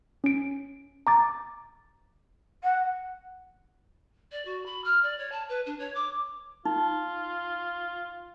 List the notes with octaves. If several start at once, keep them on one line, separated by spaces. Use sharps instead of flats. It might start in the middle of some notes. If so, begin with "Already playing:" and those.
C#4 D7
A#5 D6 A6
F#5
D5
F#4
B5
F6
D5
C#5
A5
B4
D4
C#5
D6
D#4 F4